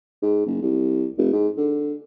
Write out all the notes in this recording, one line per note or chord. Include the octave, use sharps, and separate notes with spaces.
G#2
F#1
C2
F1
G#2
D3